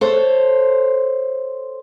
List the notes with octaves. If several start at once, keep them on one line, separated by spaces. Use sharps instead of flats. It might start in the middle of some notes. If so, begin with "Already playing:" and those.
A4 C5 C#5